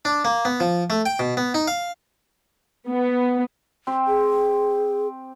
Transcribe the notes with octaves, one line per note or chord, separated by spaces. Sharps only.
D4
A#3
B3
F3
A3
G5
B2
B3
D#4
F5
B3
C4 G4 C5
G#4